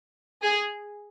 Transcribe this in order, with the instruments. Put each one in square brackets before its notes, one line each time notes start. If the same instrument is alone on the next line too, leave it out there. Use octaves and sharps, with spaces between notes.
[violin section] G#4